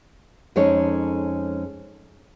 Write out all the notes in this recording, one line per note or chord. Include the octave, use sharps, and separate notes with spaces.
F2 G#3 C#4 D#4 A4 C#5